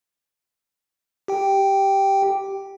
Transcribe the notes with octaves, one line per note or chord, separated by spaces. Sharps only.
G4 G5